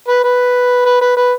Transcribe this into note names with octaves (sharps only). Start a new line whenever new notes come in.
B4
B4
B4
B4
B4